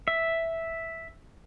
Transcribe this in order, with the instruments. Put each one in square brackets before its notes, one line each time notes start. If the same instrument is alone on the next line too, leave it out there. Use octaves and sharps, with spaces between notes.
[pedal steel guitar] E5